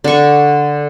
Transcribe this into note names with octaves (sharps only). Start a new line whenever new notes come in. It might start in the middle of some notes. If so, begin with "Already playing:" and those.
D3 C#6